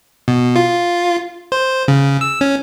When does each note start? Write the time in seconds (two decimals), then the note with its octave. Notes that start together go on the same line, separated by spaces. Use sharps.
0.28 B2
0.56 F4
1.52 C5
1.88 C#3
2.21 E6
2.41 C#4